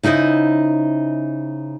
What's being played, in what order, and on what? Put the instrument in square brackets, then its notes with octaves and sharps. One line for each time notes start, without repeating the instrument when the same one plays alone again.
[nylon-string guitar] C#3 D#4 E4 C5 D#5